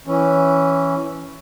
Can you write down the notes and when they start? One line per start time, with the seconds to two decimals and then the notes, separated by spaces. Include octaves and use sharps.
0.07 E3 C#4